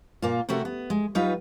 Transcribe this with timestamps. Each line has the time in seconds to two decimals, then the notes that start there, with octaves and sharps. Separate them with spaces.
0.22 A#2 A#3 F4
0.49 C3 A3 F#4 G4 A#4
0.65 B3
0.90 G#3
1.15 F#3 G3 D#4 F4 B4